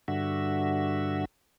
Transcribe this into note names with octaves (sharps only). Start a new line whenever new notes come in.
G2 D3 F#4 E5